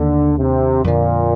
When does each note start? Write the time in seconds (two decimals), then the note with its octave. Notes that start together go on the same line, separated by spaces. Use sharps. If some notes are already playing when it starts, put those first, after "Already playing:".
Already playing: D#2 D3 D#3 A#3 D4
0.38 C3
0.84 F2 A#2 D3 F3